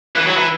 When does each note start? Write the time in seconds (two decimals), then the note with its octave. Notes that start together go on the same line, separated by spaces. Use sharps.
0.16 E3
0.26 F#3
0.37 E3